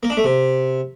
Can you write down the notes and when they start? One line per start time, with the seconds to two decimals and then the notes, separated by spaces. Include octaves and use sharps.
0.03 A#3
0.10 D4
0.17 A3
0.24 C3